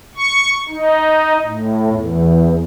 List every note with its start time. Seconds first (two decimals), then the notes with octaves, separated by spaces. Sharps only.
0.16 C#6
0.68 D#4
1.44 A2
1.89 E2